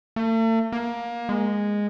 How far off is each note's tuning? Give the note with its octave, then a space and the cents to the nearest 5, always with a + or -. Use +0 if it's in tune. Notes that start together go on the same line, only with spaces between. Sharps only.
A3 +40
A#3 +20
G#3 -10